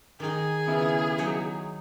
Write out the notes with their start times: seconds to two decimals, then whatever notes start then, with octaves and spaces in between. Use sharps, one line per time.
0.20 D#3 D#4 G#4
0.67 C#3 B3 E4
1.18 F#3 D#4 C#5